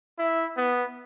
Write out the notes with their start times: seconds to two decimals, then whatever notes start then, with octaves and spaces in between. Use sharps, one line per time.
0.18 E4
0.57 B3